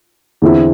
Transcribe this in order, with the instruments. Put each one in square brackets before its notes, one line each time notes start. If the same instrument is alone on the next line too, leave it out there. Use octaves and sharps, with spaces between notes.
[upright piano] E2 D3 C4 E4